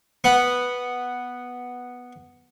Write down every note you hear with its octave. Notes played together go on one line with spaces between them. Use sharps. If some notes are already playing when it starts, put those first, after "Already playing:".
B3 F#5